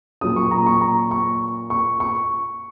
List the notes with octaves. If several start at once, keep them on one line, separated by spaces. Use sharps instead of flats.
A#2 F#3 C#4 D#6
C#6
A#5
C#6
A#5
C#6
C#6
C#6